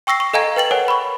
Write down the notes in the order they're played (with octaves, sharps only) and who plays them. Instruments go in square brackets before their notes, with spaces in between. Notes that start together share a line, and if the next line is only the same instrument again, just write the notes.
[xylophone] G5 C#6 E6 A#6 C7
C#6
A4 D#5 F5 G#5 A#5 G#6
B4 G5 A6 F#7
A#4 C#5 F#5 G#5
B5 C#6